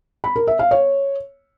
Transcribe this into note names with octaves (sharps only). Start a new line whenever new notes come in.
B5
A#4
E5
F5
C#5